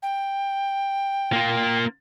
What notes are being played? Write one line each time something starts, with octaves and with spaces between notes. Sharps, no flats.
G5
A#3 F4